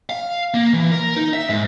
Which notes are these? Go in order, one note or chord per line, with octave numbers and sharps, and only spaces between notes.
F5
A#3
E3
A#4
D#4
E5
G#2